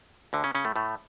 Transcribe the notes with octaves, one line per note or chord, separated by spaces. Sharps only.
D2 D3
C#3 C#4
C#3 C#4
A2 A3
A2 A3